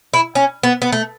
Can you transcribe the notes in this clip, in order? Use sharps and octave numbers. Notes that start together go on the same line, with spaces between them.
E4
C#4
B3
B3
A3